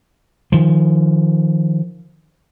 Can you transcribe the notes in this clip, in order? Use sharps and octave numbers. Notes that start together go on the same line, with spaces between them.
D#3 F3